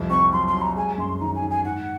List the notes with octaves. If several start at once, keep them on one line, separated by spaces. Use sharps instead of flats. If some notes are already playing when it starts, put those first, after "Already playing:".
Already playing: C2 F2
C4 C#6
F#3 C6
C6
F#3
A#5
G#3 G#5
F#2 C6
D#3 A#5
G#5
D#3
G#5
G#2 F#5